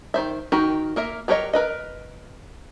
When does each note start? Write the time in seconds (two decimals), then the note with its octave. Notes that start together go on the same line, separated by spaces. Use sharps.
0.14 D#3 C5 E5
0.52 D#3 D#4 F#4 G4 A#4
0.96 A#3 A#4 E5
1.28 F#3 G4 A#4 C#5 D#5
1.53 A#4 B4 D#5